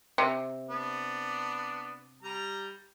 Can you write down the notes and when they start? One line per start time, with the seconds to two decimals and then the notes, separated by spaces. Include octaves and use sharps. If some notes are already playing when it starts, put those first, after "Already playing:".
0.18 C3
0.68 B3 D4
2.23 G3 A#5